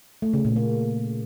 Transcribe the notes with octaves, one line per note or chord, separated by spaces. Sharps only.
A3
C#3
A#2
A#3